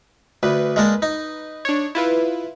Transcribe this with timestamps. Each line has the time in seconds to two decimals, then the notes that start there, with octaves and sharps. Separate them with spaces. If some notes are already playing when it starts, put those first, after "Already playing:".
0.43 D2 B4
0.76 G#3 A#3 D4
1.02 D#4
1.65 D4 C#5
1.95 E4 F4 B4